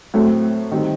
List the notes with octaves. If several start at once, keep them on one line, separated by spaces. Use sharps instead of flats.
A2 F#3 A3 C4
D#3 G3 C4